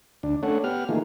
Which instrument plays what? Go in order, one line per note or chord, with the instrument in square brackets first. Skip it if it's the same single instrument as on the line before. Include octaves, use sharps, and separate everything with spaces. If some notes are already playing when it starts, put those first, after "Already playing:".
[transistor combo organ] D2 D4
A3 C#4 D4 A4 C#5 F#5
B3 G4 F#5 F6
D#3 E3 A3 A#3 F4 G#4